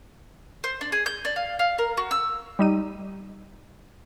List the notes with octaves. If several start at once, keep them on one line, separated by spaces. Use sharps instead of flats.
C5
D4
G#4
G6
D4
F5
F5
A#4
F#4
E6
G3 D#4 D#7